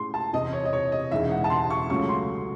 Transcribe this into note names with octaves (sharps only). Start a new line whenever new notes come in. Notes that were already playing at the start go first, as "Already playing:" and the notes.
Already playing: A2 G#3 C#4 C6
A5
E2 C3 E3 C4 E4 D#5
C#5
D#5
C#5
D#5
E1 E2 C#3 G#3 D#4 E5
F#5
A5
C6
C#6
C#2 C#3 F#3 A3 C#4 C#6
C6